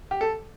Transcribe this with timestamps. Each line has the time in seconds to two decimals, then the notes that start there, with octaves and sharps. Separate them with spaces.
0.11 G4
0.21 A4